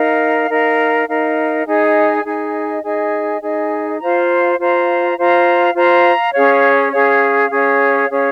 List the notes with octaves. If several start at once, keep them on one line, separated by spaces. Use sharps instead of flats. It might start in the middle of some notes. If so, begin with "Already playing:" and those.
Already playing: D#4 A#4 F5
D#4 A#4 F5
D#4 A#4 F5
D#4 G#4 D#5 G#5
D#4 G#4 D#5 G#5
D#4 G#4 D#5 G#5
D#4 G#4 D#5 G#5
F4 C5 F5 A#5
F4 C5 F5 A#5
F4 C5 F5 A#5
F4 C5 F5 A#5
C#4 G#4 C#5 F5
C#4 G#4 C#5 F5
C#4 G#4 C#5 F5
C#4 G#4 C#5 F5